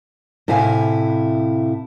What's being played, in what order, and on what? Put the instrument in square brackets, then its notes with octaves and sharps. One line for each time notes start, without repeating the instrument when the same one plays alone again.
[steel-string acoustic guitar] A2 C3 E4 F5 G#5